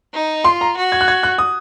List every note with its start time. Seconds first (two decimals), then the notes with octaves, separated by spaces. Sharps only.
0.14 D#4
0.44 F4 C6
0.61 A#5
0.77 F#4
0.92 G#6
1.01 F#6
1.08 G#6
1.23 F#6
1.38 D#6